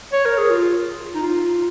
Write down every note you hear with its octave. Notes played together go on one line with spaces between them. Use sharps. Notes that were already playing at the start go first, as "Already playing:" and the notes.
C#5
A#4
G#4
F4
D#4
F4